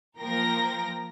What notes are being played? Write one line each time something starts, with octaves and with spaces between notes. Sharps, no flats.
F3 A#3 A#4 G5 A#5 A#6